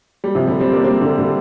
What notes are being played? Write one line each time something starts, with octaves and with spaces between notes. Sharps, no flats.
G3
C3 F3
D3 G3
G3 C4
A#3 D4
G3 C4
D3 G3
D3 G3